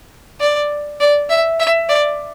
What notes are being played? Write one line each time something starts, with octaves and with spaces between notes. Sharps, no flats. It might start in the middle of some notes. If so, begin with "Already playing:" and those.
D5
D5
E5
E5
D5